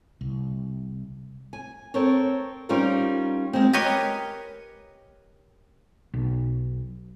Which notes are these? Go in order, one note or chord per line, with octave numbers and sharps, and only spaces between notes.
C2
G#5
C4 A4 A#4 C#5
G3 C#4 D#4 F4 A#4 C5
G#3 A#3 C4
G4 A#4 B4 C#5 D#5 G#5
B1